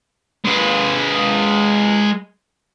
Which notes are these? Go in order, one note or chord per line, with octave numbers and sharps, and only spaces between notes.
G#3 B4